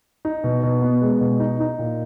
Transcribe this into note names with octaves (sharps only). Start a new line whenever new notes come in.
D#4
B2
B2
B3
G#3
B2
D#4
D#4
A#2